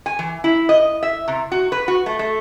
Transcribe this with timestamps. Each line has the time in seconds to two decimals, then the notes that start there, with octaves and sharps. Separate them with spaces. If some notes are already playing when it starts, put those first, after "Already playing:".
0.06 G#5
0.19 E3
0.44 E4
0.69 D#5
1.03 E5
1.28 C3
1.52 F#4
1.72 B4
1.88 F#4
2.06 A3
2.19 A3